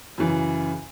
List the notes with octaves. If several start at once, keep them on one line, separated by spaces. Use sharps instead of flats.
F#2 C#3 E3